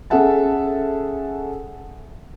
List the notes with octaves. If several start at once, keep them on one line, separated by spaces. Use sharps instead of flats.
C#4 G#4 A4 E5 F#5 A5